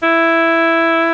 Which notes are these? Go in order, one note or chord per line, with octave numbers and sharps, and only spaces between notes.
E4